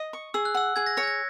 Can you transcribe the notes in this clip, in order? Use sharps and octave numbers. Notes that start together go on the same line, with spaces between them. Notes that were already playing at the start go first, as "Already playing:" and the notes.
Already playing: D#5
C#6
G#4 E6
F#6
F#5 E6
G#4 G#6
A#6
C#5 A#6
G#6
A#6